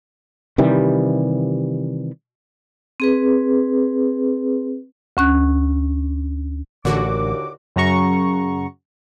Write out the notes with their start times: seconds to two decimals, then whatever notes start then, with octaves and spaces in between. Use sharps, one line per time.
0.58 C3 D#3 E3 G3
3.00 C4 G#4 B4
5.17 D2 C#4 F#6
6.85 A1 D#2 A#2 D3 F#4 D6
7.76 F#2 C#3 F#4 A#5 C#6